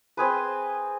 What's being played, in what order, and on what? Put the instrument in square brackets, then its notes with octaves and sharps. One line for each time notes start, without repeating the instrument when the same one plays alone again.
[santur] C4 G#4 B4